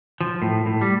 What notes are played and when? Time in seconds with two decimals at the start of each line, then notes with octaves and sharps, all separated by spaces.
0.21 F3
0.42 A2
0.66 A2
0.81 G3